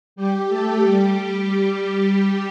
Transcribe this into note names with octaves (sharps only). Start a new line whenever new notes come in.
G3 G4
A3 A4
G3 G4